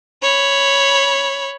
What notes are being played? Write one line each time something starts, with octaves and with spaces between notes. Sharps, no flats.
C#5 B5